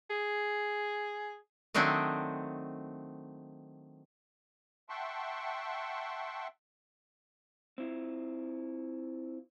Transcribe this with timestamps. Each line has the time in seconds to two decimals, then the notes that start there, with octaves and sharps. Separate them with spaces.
0.10 G#4
1.74 D#3 F#3 A3 C4 D4 D#5
4.89 E5 F#5 G5 A5 C6 C#6
7.78 C4 E4 F4